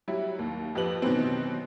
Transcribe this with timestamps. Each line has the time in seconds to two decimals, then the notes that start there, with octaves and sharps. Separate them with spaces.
0.08 F#3 G3 E4
0.39 D#2
0.75 F2 G4 B4 F#7
1.02 B2 D#3 E3 F#3 B3 C4